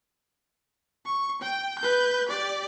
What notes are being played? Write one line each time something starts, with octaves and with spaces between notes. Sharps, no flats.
C#6
G5
B4 G6
G4 D5